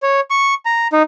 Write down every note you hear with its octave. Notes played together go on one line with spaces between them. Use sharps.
C#5
C#6
A#5
D#4